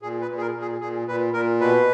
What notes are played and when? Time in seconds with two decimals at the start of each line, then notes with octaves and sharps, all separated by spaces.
0.02 A#2 G#4
0.21 B4
0.29 A#2
0.37 G#4
0.41 A#4
0.54 A#2
0.61 G#4
0.81 A#2 G#4
1.08 A#2 B4
1.33 A#2 A#4
1.60 B2 B4